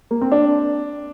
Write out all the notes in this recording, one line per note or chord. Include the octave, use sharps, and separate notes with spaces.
A#3
C4
D4